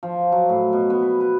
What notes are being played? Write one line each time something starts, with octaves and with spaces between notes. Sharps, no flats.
F3
F#3
A2
B2
B3
B4
B4